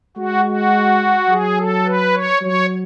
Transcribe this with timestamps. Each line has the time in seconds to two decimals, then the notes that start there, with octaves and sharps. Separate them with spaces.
0.17 G#3 F#4
0.45 F#4
1.29 F#3 G#4
1.57 A4
1.86 B4
2.14 C#5
2.41 F#3 C#5